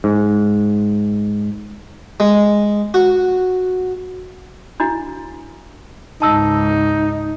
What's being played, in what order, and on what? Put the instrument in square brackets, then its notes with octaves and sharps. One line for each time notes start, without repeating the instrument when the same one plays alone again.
[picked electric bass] G#2
[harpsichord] G#3
F#4
[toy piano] D4 E4 F#4
[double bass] C#2 G#2 [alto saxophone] D#4 [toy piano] A5 E6